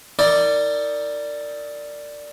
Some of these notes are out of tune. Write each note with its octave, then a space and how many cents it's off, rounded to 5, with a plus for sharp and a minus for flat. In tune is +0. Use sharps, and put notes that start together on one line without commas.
D#4 +35 A#4 -35 D5 +0